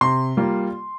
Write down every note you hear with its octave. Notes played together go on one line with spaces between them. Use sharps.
C3 C6
G3 A#3 F4